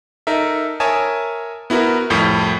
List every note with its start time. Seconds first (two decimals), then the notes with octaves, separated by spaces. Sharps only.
0.27 D#4 A4 A#4 E5
0.80 A#4 C#5 E5 G#5 A5 D#6
1.70 B3 E4 F#4 A#4 B4
2.10 C2 F2 A2